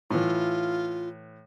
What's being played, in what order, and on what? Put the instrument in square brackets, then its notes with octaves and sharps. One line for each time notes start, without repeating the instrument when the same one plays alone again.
[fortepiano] A2 E3 [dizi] F4